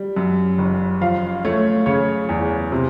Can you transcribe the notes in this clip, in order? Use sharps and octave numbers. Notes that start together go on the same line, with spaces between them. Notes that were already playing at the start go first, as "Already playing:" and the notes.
Already playing: G3
F#2
F#1
F3 F5
A3 C#5
C#3 C#5
E2
C3